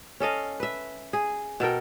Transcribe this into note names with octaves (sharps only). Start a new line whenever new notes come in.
C#4 A4 D#5 F5
B4 E5
G#4
B2 A4 A#4 G5